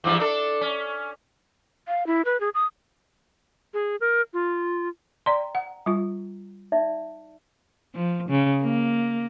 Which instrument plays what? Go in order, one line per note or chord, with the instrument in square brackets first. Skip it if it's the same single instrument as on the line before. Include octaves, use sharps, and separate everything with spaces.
[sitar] E2 G2 F3
D4 A4
C#4
[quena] F5
E4
B4
G#4
D#6
[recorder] G#4
A#4
F4
[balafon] D5 C6 [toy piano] G5 A#5
[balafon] F#5
G3 F4
[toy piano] D#4 D5 E5
[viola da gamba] F3
C#3
A#3